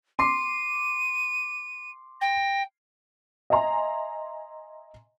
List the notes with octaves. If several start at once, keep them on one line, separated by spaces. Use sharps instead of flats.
C6 D6 C7 D#7
G5 A#6
D#5 E5 G#5 A#5 C6